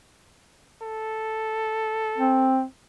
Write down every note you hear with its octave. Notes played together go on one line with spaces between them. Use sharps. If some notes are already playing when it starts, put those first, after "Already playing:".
A4
C4